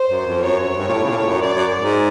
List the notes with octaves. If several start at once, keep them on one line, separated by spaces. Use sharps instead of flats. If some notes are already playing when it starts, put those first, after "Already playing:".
Already playing: C5
F#2
F2
F#2 C#5
F#2
G2
A#2
A2
C#3
A#2
A2
F#2
F#2 D5
F#2
G#2